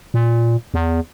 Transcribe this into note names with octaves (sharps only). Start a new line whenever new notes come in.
A#2
E2